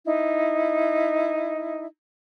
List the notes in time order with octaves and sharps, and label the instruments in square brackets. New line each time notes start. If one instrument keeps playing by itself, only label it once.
[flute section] D#4 E4